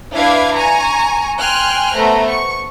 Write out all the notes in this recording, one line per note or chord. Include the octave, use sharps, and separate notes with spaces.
D4 E4 B4 F5 D6 G#6
G#5 A#5 C#6
G5 G#5 C6 F6 F#6
A3 B3 C5 A#5
C#6